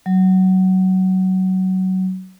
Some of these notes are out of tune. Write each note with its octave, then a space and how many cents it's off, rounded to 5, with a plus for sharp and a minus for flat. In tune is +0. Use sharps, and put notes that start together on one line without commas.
F#3 +20